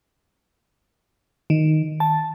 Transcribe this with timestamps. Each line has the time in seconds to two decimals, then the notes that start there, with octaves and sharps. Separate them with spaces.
1.50 D#3
2.00 A5